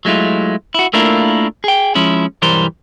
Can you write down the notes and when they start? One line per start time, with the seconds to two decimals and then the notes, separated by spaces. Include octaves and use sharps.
0.05 F#3 G#3 A3 E4 F4
0.74 E4 F#4
0.94 A3 A#3 D4 E4 F4 A#4
1.64 G#4 G5
1.95 F3 G#3 C#4 E4
2.42 B1 G2 E3 G3 A#4 C5